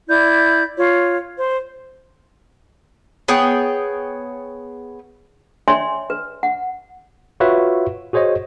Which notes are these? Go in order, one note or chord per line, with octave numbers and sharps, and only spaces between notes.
E4 D5 G6
F4 C#5
C5
B3 G#4 C#5 G5
C#5 D5 E5 G5 G#5 C6
B4
F#5
F4 F#4 B4 C#5 E5
F#4 G#4 C5 C#5 D#5